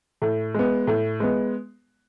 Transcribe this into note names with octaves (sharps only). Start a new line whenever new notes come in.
A2
G#3 B3
A2
G#3 B3